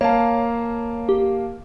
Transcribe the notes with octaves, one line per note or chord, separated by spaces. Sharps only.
A#3 C#5 F5 A5
G4